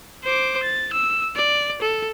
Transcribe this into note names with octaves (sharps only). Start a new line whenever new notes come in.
C5 D6
A6
E6
D5
A4